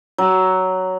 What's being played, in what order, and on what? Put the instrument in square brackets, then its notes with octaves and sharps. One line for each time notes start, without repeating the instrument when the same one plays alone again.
[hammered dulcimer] F#3